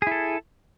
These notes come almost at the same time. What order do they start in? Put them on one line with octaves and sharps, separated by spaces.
G#4 E4 A4